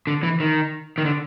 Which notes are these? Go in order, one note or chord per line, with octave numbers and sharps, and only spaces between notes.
D3
E3
D#3
D#3
D3